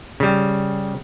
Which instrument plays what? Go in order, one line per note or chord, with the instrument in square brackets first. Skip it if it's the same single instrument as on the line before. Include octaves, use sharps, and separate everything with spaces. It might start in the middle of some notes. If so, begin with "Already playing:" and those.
[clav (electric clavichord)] C#3 G3